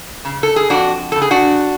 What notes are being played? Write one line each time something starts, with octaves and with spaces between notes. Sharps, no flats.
C#3
A4
G#4
F2 D4 F#4
C#3 A4
G#4
D4 F#4